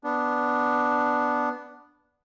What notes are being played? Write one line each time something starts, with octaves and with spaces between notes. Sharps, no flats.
B3 D4